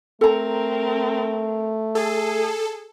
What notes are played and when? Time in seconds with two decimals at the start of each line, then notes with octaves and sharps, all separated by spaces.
0.21 A3 C4 A4 A#4 A#5
1.95 G#4 A4